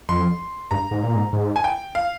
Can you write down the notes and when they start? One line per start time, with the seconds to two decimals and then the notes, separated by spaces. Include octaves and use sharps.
0.09 F2 C6
0.71 G2 A#5
0.91 G#2
1.03 A#2
1.16 G#2
1.33 G#2
1.56 G#5
1.64 G5
1.95 F5